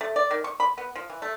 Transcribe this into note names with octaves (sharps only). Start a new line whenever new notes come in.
A3
D5
D#3
C#6
B5
B3
F3
E3
A3